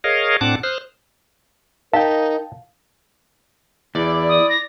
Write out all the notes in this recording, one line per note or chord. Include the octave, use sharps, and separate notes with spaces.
G#4 A#4 C#5 D#5 F5
A2 C4 D4 F#5 A5 D6
C5 D#6 F6 F#6
D#4 A#4 F5 G5 A5
E2 E4 D5
D#6
A#6